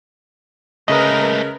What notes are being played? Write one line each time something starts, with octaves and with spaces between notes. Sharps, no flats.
C#3 G#3 A3 A#4 B4 D#5